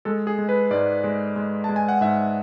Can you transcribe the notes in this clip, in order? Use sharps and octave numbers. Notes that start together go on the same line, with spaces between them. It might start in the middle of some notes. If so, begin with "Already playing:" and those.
G#3 A4
G#4
G#3
B4
G#2 D5
G#3
G#3
G#3 A5
G#5
F#5
G#2 E5